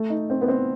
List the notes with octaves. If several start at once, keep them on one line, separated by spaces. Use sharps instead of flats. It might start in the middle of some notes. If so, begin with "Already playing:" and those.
Already playing: A3
D#4
C4
B3
C4